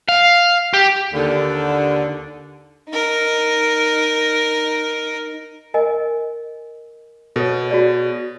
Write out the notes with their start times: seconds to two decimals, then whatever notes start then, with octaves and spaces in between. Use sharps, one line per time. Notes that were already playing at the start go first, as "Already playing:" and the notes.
0.09 F5
0.74 G4
1.13 D#2 D3
2.89 D#4 A#4
5.74 A#4 D#5 G#5
7.36 B2 A4 C#5
7.71 F#4 G#4 D5